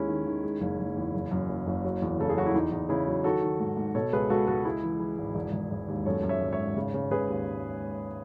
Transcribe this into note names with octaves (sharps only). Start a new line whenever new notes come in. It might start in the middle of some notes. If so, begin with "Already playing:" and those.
Already playing: D#2 G#3 C#4 E4
D#3
D#3
G#3
F#1
F#1
E2
F#1
F#2
F#1
F#1
F#3
E2
C#3 A4
G#4
F#3 F#4
E4
E2 D#4
E2
C#3 E4 G#4
F#3
D#3 F#4 A4
D#3
G#2
G#2
B2 A4 C#5
C#2 G#4 B4
C#2 F#4 A4
C#2 F#4 A4
G#3 E4 G#4
E3
E3
G#1
E1
E1
E1
D#2
F#2 A4 C#5
F#2
C#5 E5
G#1
C#5 E5
G#1
C#3
C#3
C#3 G#4 B4
D#2